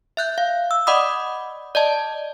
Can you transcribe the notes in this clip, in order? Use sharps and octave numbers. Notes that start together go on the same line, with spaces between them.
E5 F#6 G6
F5
E6
D5 D#5 F#5 B5 D6 D#6
D5 D#5 A5